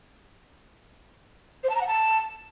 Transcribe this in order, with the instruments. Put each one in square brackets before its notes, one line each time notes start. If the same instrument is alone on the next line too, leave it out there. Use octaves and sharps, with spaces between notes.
[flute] C5
A5
A#5
F#5
A5